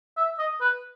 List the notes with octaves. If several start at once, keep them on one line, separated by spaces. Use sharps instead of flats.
E5
D#5
B4